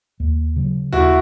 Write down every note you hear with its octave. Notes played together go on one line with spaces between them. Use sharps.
D#2
C#3 F#3
D#2 E4 F#4